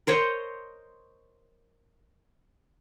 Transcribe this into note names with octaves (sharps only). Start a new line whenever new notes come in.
A#4 C5 C#5 D#5